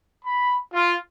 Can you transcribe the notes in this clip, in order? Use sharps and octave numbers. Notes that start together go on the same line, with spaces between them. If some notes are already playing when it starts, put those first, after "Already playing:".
B5
F4